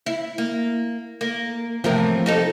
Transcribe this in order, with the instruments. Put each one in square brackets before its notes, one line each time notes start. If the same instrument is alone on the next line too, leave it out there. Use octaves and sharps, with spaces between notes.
[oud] E4
A#3
A#3
[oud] A2 C3 E3 [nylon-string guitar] F3 A#3 A#4
[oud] G3 D#4 A4